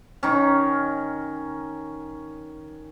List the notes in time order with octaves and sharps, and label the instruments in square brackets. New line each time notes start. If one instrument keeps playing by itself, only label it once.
[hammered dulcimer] D#3 C#4